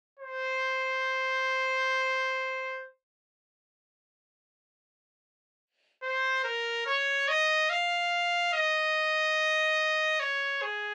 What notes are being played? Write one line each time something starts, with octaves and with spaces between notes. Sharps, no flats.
C5
C5
A#4
C#5
D#5
F5
D#5
C#5
G#4